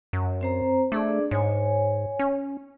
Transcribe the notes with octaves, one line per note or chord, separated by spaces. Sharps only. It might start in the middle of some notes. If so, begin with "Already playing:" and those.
F#2
C4 C5 A#5
A3 D4 G#4 D5
G#2 C#5 G#5
C#4